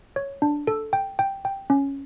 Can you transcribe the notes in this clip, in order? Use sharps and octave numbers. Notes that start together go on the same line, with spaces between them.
C#5
D4
A4
G5
G5
G5
C#4